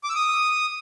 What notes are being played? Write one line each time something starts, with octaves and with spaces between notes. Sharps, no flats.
D6
E6
D#6